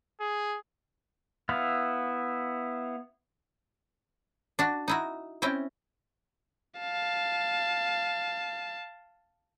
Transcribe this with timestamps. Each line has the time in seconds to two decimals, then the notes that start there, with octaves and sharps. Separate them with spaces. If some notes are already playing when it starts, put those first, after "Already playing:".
0.20 G#4
1.49 B3 E4 F5
4.59 D4 F#4
4.88 D#4 E4 F#4
5.42 C4 C#4 E4 G5
6.79 F5 A5